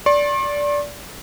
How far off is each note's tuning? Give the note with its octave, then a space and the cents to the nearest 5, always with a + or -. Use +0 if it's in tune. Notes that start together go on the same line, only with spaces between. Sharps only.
D5 -15 C6 +45